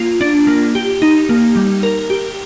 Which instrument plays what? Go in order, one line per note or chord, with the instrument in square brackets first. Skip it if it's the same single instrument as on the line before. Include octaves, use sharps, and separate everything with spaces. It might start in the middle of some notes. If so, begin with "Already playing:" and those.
Already playing: [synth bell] A#3 F4
D4
A#3
G4
D#4
A#3
G3
A#4
G4